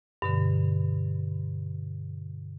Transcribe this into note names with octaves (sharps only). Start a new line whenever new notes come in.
G2 B2 D3